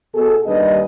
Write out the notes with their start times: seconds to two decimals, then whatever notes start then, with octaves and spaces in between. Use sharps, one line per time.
0.15 B2 G#4 A4
0.46 D#2 G3 D4 B4 D#5